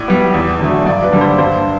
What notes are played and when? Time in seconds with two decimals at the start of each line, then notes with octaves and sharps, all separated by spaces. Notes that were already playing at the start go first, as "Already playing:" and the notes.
Already playing: A2 D5
0.08 G3 B3
0.34 E2
0.60 D3 F#3 A3
0.86 G2 D5
1.04 B4
1.12 D3 G3
1.21 C5
1.38 G2 C5